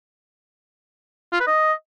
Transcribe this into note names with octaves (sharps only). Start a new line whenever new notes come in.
F4
B4
D#5